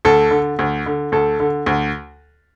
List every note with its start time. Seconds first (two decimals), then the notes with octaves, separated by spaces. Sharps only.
0.05 D2 A4
0.31 D3
0.59 D2
0.86 D3
1.12 D2 A4
1.40 D3
1.66 D2